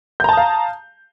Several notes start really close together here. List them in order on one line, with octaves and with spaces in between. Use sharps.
G6 A#5 A5 D#6 F5